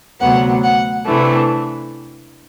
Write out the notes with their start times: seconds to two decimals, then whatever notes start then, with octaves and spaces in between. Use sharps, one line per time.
0.20 D2 C3 F#3 B3 F#5
0.63 F#5
1.05 C3 E3 A3 D4